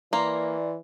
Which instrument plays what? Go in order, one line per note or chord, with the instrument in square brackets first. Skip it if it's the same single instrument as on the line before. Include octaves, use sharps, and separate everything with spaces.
[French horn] E3 [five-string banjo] A#3 [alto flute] D5 [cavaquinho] A#5 C6